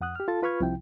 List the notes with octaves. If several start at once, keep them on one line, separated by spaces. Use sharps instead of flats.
F2 F#5 D#6 F#6
G4 F6
F4 A4 A5 A6
F4 B4 B5 C#6 F6 G#6
C2 C3 F3 E4 G5